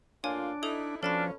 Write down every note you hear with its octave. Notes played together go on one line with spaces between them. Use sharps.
A2 A#3 D4 F4 C#5 G#5
D#4 E4 A4 D#6 F7
B2 F3 C#4 D4 A4 A5 B5